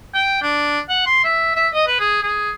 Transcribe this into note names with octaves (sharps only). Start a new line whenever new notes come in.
G5
D4
F#5
C6
E5
E5
D#5
B4
G#4
G#4